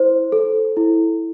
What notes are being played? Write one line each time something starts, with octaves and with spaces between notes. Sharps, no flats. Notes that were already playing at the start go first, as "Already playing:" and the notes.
Already playing: E4 C5
A4
E4